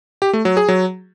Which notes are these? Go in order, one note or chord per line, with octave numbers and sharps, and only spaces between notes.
G4
A3
F#3
G#4
F#3